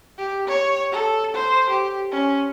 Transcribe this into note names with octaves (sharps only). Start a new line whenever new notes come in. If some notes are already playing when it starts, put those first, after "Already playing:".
G4
C#5
A4
C5
G4
C#4